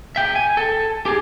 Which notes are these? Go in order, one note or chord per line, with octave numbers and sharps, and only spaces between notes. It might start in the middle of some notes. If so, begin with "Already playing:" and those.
E5 G5
G#5
A4
G4 G#4